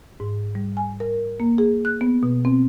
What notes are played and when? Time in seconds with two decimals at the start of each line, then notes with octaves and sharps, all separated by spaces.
0.20 G#2
0.55 G3
0.77 G#5
1.00 A#4
1.40 A#3
1.58 G#4
1.85 F#6
2.01 B3
2.23 B2
2.45 C4